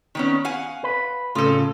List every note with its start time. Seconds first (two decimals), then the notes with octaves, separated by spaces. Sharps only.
0.15 D#3 B3 C#4
0.45 F5 F#5 G#5
0.84 B4
1.35 A2 C#3 F4 A4